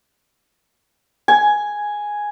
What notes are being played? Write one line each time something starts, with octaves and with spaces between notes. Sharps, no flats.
G#5